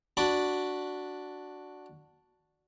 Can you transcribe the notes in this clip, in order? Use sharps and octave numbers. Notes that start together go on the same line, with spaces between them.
D4 F#4 D5 B5